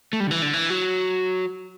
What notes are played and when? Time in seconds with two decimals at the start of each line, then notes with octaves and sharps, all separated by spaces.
0.13 A3
0.20 G3
0.27 D3
0.31 E3
0.42 D3
0.53 E3
0.70 F#3